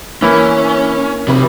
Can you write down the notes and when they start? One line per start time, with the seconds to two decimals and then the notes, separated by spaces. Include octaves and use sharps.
0.22 E3 A#3 C#4 E4
1.28 C3 F#3 B4